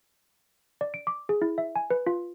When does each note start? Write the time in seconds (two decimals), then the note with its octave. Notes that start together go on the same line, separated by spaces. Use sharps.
0.81 D5
0.94 D7
1.07 D6
1.29 G#4
1.42 E4
1.58 E5
1.76 G#5
1.90 B4
2.07 F4